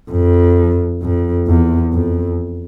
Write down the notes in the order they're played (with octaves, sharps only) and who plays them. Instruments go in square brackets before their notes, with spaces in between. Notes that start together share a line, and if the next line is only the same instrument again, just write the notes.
[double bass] F2
F2
E2
F2